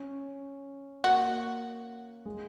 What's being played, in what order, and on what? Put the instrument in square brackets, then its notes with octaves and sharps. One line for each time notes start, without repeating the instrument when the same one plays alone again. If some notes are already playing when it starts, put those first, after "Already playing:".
Already playing: [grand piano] C#4
[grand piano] A#3 [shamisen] F#4
[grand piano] G#3